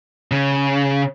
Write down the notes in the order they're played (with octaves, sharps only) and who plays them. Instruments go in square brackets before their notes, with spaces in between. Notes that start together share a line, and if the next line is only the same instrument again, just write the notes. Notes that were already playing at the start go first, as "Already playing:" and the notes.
[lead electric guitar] C#3